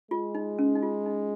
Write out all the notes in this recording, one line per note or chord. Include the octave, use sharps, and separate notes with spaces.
G#3 F4
D#4
C#4
D#4
F4
D#4